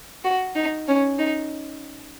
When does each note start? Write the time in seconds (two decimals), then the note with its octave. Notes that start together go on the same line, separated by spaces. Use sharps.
0.24 F#4
0.56 D#4
0.88 C#4
1.19 D#4